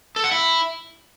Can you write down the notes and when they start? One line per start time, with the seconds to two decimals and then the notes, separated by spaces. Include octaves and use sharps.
0.16 A4
0.24 F#5
0.31 E4